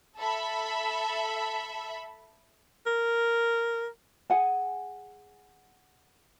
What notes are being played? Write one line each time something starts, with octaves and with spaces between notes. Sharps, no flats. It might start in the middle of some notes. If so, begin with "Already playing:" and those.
A4 E5 B5
A#4
G#4 F#5 G#5